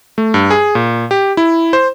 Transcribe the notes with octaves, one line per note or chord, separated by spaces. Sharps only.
A3
G2
G#4
A#2
G4
E4
C5